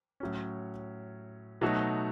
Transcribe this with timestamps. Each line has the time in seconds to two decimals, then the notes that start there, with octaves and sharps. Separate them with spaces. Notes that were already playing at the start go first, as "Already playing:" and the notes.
0.20 A2 F#3 C#4
1.61 B2 F#3 A3 D#4 F#4